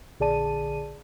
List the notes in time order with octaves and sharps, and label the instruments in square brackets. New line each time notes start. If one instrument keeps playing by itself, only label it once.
[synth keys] A#1 D3 G#4 D5 A5 D#7